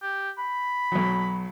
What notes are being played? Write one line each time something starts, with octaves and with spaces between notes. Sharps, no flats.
G4
B5
B1 F#3